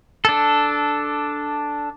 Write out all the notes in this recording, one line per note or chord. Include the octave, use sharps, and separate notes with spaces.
D4 A4